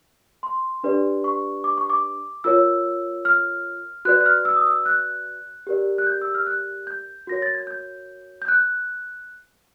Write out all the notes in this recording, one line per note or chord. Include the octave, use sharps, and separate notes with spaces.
C6
D4 G4 B4 D5
C#6
D6
C#6
D6
F4 A#4 C#5 E6
F6
F#4 B4 D5 F#6
F#6
F6
E6
D#6
E6
F#6
G4 A#4 D5
F#6
G6
E6
F6
F#6
G6
F#4 A#4 C#5 A#6
A6
G#6
G6
G6
F#6